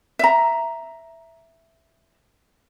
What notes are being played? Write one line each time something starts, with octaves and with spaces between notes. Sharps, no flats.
E5 A#5